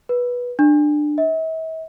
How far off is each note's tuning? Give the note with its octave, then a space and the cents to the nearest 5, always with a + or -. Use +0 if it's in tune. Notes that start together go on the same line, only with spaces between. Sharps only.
B4 -15
D4 +20
E5 -45